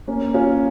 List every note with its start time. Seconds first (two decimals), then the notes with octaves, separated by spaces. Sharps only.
0.08 A#3 C#4
0.34 C#4 F4